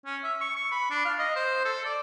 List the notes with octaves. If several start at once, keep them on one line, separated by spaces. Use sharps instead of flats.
C#4
E5
C#6
C#6
B5
D4
F5
D#5
C5
A4
D5